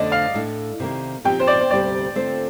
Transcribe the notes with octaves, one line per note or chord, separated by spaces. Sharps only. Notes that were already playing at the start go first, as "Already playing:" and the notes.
Already playing: F2 D3 A3 D5 D#5
F5
A2 A3 D4
C3 D#3 A#3
A#2 F3 C4 D#4 G4 G5
C5
D5
C5
D2 C3 G3 C4 G4 D5
D3 A3 C4 F4 C5